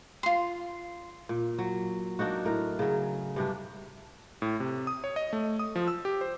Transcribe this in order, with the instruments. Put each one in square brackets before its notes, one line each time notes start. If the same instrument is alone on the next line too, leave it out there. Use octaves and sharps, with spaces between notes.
[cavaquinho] F4 C6
[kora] A#2
F#3
A#3 D4 D#4 F#4
A2 A#4
C#3 F#3
G2 C3 D4
[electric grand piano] A2
C3
D#6
C#5
D#5
A3
D#6
F3
E6
G4
C5